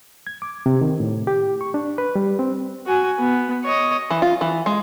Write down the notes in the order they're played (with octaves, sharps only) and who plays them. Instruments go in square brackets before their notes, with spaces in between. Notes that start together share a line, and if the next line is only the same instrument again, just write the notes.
[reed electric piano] G#6
D6
C3
D#3
A2
G4
C#6
D4
B4
G3
C4
[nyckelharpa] F#4 G#5
B3
C#5 D#5
[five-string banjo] E3
F4
E3
G#3